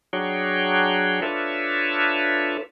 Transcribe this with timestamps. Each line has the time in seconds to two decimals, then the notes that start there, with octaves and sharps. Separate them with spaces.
0.13 F#3 D4 F#4 G#4 C#5 G5
1.22 D4 F4 A4 B4 C#5 E5